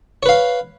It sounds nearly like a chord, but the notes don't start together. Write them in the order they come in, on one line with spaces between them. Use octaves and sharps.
C#5 B4 F5